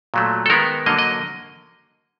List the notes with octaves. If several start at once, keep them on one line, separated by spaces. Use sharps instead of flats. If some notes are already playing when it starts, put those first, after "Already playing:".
A#2 F#3 A3
A4
D#3 G#3 B3 A#4
D3 F#3 A#3 D#5
D#5